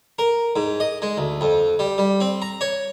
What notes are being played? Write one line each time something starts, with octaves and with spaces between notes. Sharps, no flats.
A#4
G#2
D#5
G#3
D2
F2
G3
G3
C4
A#5
C#5